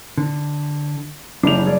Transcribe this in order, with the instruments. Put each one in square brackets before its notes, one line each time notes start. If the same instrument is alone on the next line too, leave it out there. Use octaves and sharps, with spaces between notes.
[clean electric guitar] D3
[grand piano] F#1 F7 [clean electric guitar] D4 E4 G4
[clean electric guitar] G3 G#4 D5